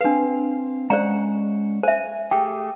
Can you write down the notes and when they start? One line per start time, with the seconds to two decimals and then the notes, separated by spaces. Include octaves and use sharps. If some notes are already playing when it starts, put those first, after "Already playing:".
0.01 C4 D4 B4 F5
0.90 G#3 C#4 C5 D5 F#5 A#5
1.83 C5 E5 G#5
2.31 A3 G4 G#4 G5